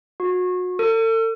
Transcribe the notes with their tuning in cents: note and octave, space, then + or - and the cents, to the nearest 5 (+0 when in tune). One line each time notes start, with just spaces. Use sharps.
F#4 -30
A4 +40